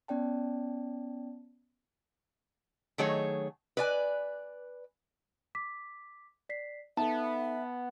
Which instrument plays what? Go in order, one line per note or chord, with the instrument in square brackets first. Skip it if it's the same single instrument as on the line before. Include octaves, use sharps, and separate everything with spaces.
[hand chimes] B3 C#4 D5 G5 A5
[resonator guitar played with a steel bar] D#3 F#3 A3 G#4 C#5
B4 D5 G#5
[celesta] D6 B6
D5 B6 C7
[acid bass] B3 [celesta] D#4 A4 [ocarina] E5 [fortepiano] A5